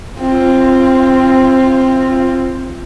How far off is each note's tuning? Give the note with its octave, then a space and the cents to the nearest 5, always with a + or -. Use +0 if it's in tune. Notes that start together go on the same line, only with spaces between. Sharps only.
C4 +10 F4 -15